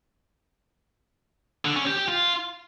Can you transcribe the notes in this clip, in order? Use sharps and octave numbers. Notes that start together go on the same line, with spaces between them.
D3
C#4
G4
G4
F4